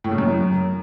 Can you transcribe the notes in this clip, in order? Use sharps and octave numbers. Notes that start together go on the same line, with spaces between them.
A2
C#3
F#2